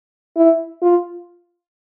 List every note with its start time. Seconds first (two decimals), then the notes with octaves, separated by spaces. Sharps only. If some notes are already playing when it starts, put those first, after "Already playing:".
0.36 E4
0.82 F4